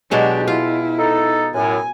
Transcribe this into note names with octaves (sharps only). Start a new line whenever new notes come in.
B2 F#3 G#3 D4 G4
E4 F4
D#4 A4
F#2 A2 F#3 G#5